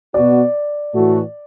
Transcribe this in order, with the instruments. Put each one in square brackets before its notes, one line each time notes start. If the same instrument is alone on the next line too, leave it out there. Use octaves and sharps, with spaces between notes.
[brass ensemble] B2 B3 F#4 [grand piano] D5
[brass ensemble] A2 E3 A3 F#4